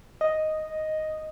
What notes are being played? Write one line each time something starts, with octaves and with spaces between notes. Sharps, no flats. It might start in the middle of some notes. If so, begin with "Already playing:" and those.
D#5